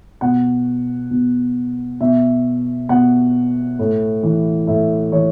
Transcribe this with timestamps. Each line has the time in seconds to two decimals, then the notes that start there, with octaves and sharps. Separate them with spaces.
0.21 B2 F#5
1.11 B2
2.01 B2 E5
2.89 B2 F#5
3.79 A2
4.23 E3
4.67 A2 E5
5.12 E3 C#5